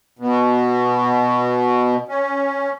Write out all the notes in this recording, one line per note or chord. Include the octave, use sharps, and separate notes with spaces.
B2
C#4